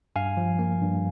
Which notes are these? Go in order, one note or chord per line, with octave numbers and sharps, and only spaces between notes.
G2 F5 G#5
F3
A#3
G2